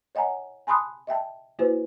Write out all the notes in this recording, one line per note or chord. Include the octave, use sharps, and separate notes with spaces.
C#5 D#5 F#5 G#5 A#5
G#5 A5 B5 C6 D#6 F#6
D#5 E5 G5 A5
A#3 E4 F#4 B4 C5